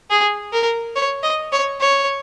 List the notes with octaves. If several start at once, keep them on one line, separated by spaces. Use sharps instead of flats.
G#4
A#4
C#5
D#5
C#5
C#5